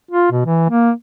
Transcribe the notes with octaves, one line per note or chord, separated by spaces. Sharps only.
F4
B2
E3
A#3